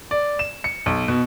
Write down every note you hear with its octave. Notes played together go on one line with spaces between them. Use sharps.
D5
E7
C#7
B1
B2